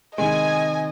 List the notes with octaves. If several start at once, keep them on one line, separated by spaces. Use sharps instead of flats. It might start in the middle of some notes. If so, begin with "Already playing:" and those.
C3 D#3 G#3 D#5 G#5